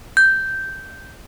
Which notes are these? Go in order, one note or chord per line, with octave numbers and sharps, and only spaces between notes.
G6